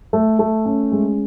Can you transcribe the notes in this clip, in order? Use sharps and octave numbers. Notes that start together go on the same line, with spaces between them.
A3
A3
C#4
G#3